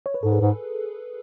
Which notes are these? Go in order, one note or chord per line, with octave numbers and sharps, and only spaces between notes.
C#5
B4
G#2 A4
G#4 B4
G#2